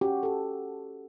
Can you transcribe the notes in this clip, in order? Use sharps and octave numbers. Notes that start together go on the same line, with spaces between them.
C#4 F#4 G4
G4 A4